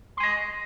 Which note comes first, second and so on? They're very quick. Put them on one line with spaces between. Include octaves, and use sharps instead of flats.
C6 G#5 D#5